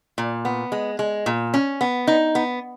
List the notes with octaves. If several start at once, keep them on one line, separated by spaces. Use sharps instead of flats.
A#2
B3
G#3
G#3
A#2
C#4
B3
D#4
B3